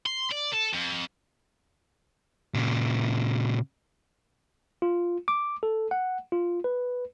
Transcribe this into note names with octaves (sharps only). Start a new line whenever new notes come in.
C6
D5
A4
F2
A#2 C#3
F4
D6
A4
F#5
F4
B4